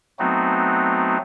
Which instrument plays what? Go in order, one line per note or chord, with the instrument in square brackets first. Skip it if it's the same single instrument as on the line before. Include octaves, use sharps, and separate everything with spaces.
[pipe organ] F#3 A3 B3 C4 D#4 F#4